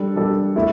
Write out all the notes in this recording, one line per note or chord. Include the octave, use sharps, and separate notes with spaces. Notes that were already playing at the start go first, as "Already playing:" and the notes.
Already playing: G3 D4 A4
G3 D4 A4
A3 E4